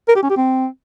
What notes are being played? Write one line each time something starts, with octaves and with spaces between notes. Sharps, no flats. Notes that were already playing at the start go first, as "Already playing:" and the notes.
A#4
G4
C#4
G4
C4